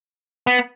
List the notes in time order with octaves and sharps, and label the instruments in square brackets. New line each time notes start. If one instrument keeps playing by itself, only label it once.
[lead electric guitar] B3